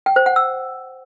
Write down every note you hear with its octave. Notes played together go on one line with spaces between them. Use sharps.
G5
C5
F#5
E6